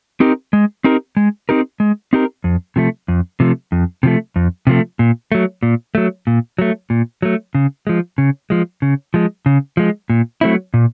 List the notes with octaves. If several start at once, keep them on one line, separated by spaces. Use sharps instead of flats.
C4 D#4 G4 A#4
G#3
C4 D#4 G4 A#4
G#3
C4 D#4 G4 A#4
G#3
C4 D#4 G4 A#4
F2
C3 F3 A3
F2
C3 F3 A3
F2
C3 F3 A3
F2
C3 F3 A3
A#2
F#3 A3
A#2
F#3 A3
A#2
F#3 A3
A#2
F#3 A3
C#3
F3 G#3
C#3
F3 G#3
C#3
F3 G#3
C#3
F3 G#3
A#2
F#3 A3 C4 E4
A#2